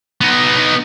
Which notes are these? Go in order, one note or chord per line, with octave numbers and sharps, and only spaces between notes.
B3 D#4